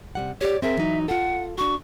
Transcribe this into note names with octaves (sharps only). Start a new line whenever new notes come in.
C3 G3 F#5
G4 C#5 D5
C4 G#4 A#4 E5
E3 F#3 D#4
F4 A4 F#5
D4 F#4 C#6